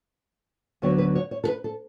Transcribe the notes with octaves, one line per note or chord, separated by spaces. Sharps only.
D2 D3 F#3 B3 C#5
B4
C#5
C#5
A4
B4
A4